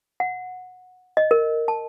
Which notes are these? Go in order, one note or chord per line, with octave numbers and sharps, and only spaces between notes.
F#5
D#5
A#4
A5